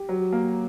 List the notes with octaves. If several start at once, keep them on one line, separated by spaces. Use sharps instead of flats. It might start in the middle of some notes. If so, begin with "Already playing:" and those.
Already playing: G4
F#3
A#3